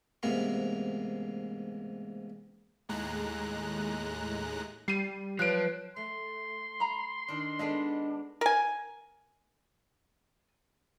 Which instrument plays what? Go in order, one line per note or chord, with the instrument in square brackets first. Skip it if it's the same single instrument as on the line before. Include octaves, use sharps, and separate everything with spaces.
[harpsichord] A1 G#2 C3 A#3 B3 A#4
[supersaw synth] D#2 A2 G#3 A#5 F#6
[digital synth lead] G3 [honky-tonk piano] C7 D#7
[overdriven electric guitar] F3 [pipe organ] F#3 B4 C#5 [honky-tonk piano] F#6 D7
[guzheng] A3 [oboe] C6
[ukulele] A#5 B5
[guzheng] D#3 D4
[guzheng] G#3 B3 D4 [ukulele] A4 D#5
[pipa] A#4 G#5